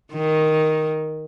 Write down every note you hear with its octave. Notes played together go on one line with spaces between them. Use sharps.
D#3